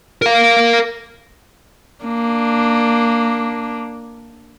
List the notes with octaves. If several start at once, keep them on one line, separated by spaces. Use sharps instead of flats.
A#4 F5
A#3 D4